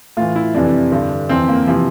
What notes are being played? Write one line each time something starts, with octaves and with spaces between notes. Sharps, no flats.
A2 E3 F4
E4
F2 C3 E3 D4
G2 D3
F2 E3 C4
A#3
C3 E3 F3